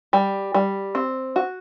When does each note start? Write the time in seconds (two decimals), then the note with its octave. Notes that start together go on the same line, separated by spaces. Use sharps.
0.13 G3
0.54 G3
0.95 C4
1.36 F#4